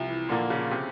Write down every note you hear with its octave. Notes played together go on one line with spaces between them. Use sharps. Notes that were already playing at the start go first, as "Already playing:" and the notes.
Already playing: C2 F3
E3
A#2 D3 F3 A#3
C#3
C3